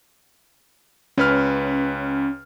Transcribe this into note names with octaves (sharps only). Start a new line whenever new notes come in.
C#2 C#4 B4 F6